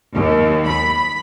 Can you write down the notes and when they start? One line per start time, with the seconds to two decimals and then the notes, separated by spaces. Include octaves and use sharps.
0.14 D#2
0.67 B5